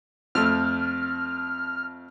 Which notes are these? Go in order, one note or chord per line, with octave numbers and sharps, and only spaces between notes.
F2 A3 F6